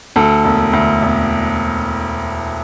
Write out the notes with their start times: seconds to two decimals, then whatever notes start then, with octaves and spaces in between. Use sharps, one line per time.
0.16 D2 A4
0.45 E1
0.73 D2
1.02 E1